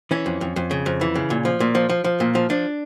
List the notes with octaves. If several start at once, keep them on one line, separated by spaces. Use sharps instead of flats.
E3 C#4
F2
F2
F2
C#3
F2
E3
C#3
A#2
F3
A#2
F3
F3
F3
A#2
F3
F3 D4